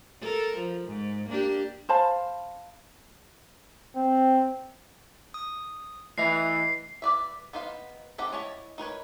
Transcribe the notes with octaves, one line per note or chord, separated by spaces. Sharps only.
A4 A#4
F3
G#2
A#3 D4 G4
C5 F5 A5 B5
C4
D#6
E3 A3 D#5 E5 C7
B4 D5 E5
B3 D#4 B4 C5 F5
C4 D#4 G4 A4 F#5
C#4 E4 C#5 D#5 A5
D#4 A#4 B4 C#5